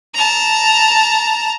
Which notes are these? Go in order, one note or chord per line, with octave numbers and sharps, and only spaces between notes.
A5 A#5